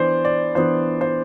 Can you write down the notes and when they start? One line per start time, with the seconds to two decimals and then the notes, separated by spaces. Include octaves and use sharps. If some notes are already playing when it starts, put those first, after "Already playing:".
Already playing: E3 B3 D4 C5 D5
0.25 D5
0.55 E3 B3 D4 C5
1.01 C5